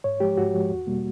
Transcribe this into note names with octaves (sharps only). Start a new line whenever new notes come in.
G#2 C#5
F3 G#3 G4
G#2 F#4
F3 G#3
E2
B2 G3 A#3